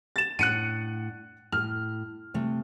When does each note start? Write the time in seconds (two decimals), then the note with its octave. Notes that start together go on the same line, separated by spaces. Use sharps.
0.16 A6 E7
0.39 A2 D4 F#5 F#6 C#7 D#7
1.52 A2 F6
2.34 C3 A3